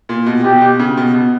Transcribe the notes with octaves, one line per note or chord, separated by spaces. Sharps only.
A#2
B2
B2 G4
B2
C#3
B2
B2